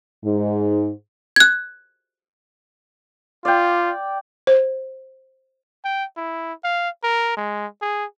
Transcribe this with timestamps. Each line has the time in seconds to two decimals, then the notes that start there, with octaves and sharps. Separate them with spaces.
0.25 G#2
1.36 F#6 G#6
3.45 F4 D5 G5
4.47 C5
5.85 G5
6.17 E4
6.64 F5
7.03 A#4
7.37 G#3
7.82 G#4